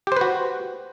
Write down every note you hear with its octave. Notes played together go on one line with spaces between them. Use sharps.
F#4 G4 B4 C5